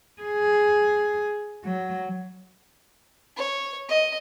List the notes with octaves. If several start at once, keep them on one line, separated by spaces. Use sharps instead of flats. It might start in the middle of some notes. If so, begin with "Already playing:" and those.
G#4
F#3
C#5
D#5